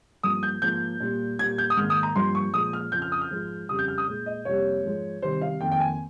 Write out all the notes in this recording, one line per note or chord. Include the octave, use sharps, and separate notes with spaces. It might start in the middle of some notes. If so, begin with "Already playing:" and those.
G2 F3 A#3 D#6
G6
G#2 F3 A#3 G6
A#2 G3 A#3
A#2 G3 A#3 G#6
G6
D#6
G#2 D#3 A#3 F6
D#6
A#5
G2 F3 A#3 C6
C#6
A#2 F3 G#3 D#6
F6
F2 C#3 F3 G6
F6
D#6
F6
G#2 F3 G#3
F2 C#3 G3 D#6
G6
F6
D#6
A#2 G#3
D#5
F2 C3 G3 A#3 C#5
G#2 F3 G#3
C3 D#3 G3 C5
F5
F2 D#3 A#3 G5
G5
G#5